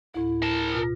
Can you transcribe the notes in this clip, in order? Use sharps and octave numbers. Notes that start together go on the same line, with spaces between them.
D2 A2 E4
A#4 A5
B2 F4